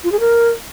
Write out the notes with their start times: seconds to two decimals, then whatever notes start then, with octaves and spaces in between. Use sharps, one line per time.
0.04 F4
0.12 G#4
0.20 A#4